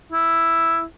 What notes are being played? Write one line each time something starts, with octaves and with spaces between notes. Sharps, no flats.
E4